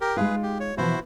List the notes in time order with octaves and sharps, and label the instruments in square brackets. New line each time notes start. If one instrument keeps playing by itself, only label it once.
[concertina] G4 A#4
[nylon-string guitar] G#3 D#4 F4 [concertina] G#4 B4
[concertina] G4
C#5
[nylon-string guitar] B2 E3 F3 [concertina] E4 F#4 C5